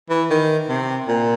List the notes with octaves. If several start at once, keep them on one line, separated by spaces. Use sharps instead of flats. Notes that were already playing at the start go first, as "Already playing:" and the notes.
E3
D#3
C3
A#2